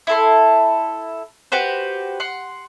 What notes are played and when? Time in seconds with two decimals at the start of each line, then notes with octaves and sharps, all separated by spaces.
0.07 E4 A4 C6
1.52 F#4 G4 B4 C5
2.20 F#5 C6